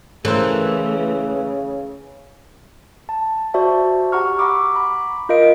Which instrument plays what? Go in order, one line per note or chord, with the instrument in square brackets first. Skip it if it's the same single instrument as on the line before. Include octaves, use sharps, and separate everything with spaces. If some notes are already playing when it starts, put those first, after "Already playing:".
[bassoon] C#3 [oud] E3 [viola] A3 [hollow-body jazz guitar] A4 A#4 C5
[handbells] A5
F#4 C5 D5 E5 A5
G4 F#5 A#5 C#6 F6
F#5 A#5 B5 C#6 D6 E6
A#5 B5 D6
F4 A#4 D#5 F5 D7